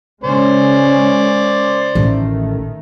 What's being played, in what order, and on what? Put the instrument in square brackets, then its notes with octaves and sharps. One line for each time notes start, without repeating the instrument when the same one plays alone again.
[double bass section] C#3 G#3 C#4 [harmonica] C5 D5
[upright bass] A1 [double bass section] D#3 A3